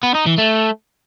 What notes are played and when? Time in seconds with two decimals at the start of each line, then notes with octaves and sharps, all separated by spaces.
0.03 B3
0.15 D#4
0.27 E3
0.38 A3